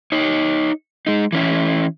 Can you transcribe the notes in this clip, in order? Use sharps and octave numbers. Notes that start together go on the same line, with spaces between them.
D#4 C#5
G#3 D#4
E3 C#4 E4